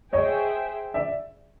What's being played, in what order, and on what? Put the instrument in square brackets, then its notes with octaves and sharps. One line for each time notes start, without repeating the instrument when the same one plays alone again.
[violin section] G#4 C5 E5 G5 [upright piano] C#5 D#5
[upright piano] D5 E5